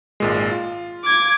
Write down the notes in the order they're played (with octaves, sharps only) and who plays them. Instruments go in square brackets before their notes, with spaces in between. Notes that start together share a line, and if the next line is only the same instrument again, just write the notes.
[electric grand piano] G#1 A#2 G#3
F4
[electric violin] D6 G#6